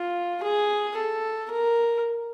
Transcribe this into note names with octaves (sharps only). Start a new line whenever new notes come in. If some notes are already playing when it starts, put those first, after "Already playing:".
Already playing: F4
G#4
A4
A#4